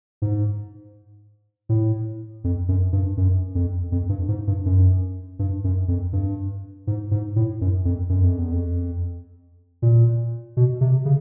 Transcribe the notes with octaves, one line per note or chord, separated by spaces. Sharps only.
G#2
A2
F2
F#2
G2
F#2
F2
F2
G2
G#2
G2
F#2
G2
F#2
F2
G2
G#2
G#2
A2
F#2
F2
F#2
F2
E2
F2
A#2
B2
C3
C#3